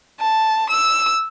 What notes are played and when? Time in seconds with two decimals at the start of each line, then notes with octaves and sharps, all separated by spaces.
0.20 A5
0.69 E6